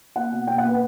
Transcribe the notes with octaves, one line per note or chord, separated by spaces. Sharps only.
A#3 F#5
B2
A#3 G5
F#5
A#3 B4